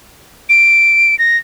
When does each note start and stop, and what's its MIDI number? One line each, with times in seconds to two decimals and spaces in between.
0.49 1.18 98
1.19 1.37 94